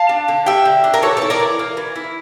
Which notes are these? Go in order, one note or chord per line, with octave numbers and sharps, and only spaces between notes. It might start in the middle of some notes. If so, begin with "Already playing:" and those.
Already playing: F5 A5
D4
D3
G3 E5 G5
D3
D4
A#4
E3 A4 C#5
E4 A4 C#5
A#4 D5
E3
A#3
E3
E4